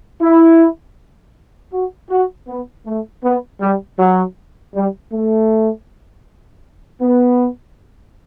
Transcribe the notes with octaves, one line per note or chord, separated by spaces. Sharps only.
E4
F#4
F#4
B3
A3
B3
G3
F#3
G3
A3
B3